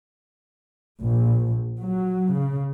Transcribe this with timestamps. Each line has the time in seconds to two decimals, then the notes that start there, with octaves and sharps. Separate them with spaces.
1.01 A#1
1.78 F#3
2.35 C#3